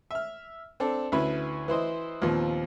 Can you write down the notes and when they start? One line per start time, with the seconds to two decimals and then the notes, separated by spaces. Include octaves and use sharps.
0.11 E5 F6
0.80 C4 D4 A4
1.12 D2 C#4 E4 B4 B5 C#6
1.68 E3 E4 C5 D#5
2.22 D#2 A#2 F3 B3 C4